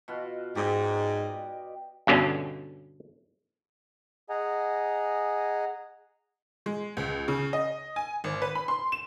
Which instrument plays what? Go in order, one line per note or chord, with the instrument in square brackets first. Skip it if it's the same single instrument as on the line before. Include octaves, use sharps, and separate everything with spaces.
[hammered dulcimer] B2 F4 F#4
[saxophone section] G#2 [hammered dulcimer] G4 D5 D#5
[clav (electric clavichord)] G2 B2 D3 C#4
[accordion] G#4 D#5 F#5 G#5 A#5
[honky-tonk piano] G#3
C#2
C#3
D#5
G#5
G#1
B4
B5
C6
E7